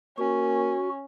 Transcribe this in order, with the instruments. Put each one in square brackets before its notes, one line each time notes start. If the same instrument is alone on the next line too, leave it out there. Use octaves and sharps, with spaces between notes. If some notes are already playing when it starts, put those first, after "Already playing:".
[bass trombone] A#3 [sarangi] C#4 [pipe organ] F#4